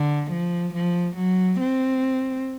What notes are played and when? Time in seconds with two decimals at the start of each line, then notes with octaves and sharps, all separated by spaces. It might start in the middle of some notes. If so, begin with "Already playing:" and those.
Already playing: D3
0.31 F3
0.75 F3
1.17 F#3
1.60 C4